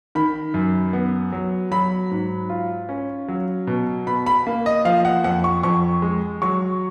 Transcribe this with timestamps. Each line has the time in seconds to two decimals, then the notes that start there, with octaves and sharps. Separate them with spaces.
0.15 D#3 B5
0.54 F#2
0.93 B3
1.32 F#3
1.71 F#3 B5
2.11 G#2
2.50 F4
2.89 C#4
3.28 F#3
3.67 B2
4.07 B2 B5
4.26 B5
4.47 A#3
4.66 D#5
4.85 F3 F5
5.05 F#5
5.24 F2 F#5
5.44 C#6
5.63 F2 C#6
6.02 G#3
6.42 F#3 C#6